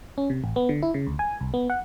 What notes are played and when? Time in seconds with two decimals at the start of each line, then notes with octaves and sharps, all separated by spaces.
0.18 C#4
0.30 C3
0.44 A1
0.56 B3
0.69 D3
0.82 E4
0.94 C#3
1.07 D2
1.19 G#5
1.41 C2
1.54 B3
1.70 F#5